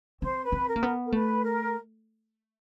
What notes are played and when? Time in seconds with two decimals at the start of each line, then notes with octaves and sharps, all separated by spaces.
0.22 C4 C5
0.44 B4
0.52 C4
0.67 A#4
0.76 A#3
0.83 B3
1.06 A#4
1.12 A3 B4
1.43 A#4